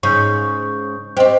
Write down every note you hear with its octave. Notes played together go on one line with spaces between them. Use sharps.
G#2 C#3 C#6 G6
C4 G4 C5 D#5